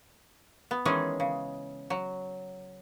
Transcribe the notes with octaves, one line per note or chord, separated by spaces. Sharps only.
B3
D#3 E3 G#3 C#4 G#4
C#3
F#3